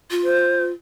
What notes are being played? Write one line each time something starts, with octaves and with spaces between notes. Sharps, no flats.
F4
C5